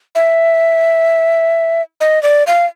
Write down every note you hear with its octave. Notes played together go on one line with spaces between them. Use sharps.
E5
D#5
D5
F5